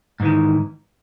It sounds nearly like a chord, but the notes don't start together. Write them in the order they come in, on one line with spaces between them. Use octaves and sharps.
G#2 E3 D#3